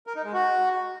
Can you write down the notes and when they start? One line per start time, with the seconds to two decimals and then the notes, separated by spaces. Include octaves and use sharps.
0.07 A#4
0.16 D#4
0.24 G#3
0.33 F#4